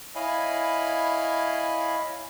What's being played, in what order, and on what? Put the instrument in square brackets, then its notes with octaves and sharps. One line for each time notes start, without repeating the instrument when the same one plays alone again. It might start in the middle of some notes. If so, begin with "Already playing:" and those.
[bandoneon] E4 C#5 D#5 F5 G#5 B5